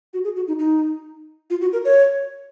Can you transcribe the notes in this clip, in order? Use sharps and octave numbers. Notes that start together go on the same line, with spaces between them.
F#4
G#4
F#4
D#4
D#4
F4
F#4
A#4
C#5